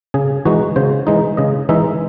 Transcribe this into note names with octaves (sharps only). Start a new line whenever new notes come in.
C#3 G#4
E3 G#3 D#4 F#4
C#3 C5
E3 G#3 D#4
C#3 D#5
E3 G#3 D#4 E5